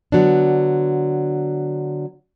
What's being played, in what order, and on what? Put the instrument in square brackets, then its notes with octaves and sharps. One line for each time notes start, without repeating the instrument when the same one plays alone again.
[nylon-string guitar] D3 F#3 B3 D4